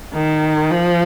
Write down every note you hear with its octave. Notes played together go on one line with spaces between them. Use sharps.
D#3
F3